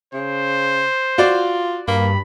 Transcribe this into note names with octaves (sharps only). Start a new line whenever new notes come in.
C#3 C5
F4 F#4 D5
G2 A#3 B5